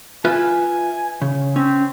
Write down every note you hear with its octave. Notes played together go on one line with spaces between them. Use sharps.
F4 B4 E5 G#5
C#3
C4 C#4